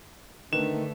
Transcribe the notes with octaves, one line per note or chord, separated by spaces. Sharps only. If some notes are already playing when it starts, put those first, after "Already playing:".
D3 D#3 A3 B4 E7